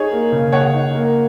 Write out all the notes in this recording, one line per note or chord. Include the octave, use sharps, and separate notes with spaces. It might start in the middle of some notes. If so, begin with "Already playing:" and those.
Already playing: D#4 G#4 C#5
A#3
C#3
C#3 C#5 F#5
D#4
A#3